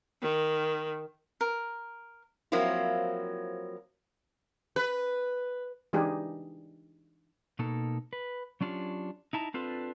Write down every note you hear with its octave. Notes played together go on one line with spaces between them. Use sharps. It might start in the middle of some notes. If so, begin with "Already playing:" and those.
D#3
A#4
F3 F#3 A#3 C4 E4
B4
E3 G#3 D4 D#4 G4 G#4
B2 A#3 D#4 A4
B4
F#3 C#4 D4 F4 G4 C#5
D#4 E4 A5 A#5
C4 D4 F4 A4 B4